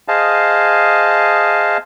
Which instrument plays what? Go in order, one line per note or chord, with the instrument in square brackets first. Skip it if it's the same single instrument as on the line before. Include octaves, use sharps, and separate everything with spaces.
[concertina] G#4 C5 D#5 F5 A5